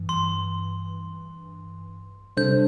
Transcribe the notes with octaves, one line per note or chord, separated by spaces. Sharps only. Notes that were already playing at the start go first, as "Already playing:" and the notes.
Already playing: G2 E3
C6
C3 G3 D4 A4 C5 G6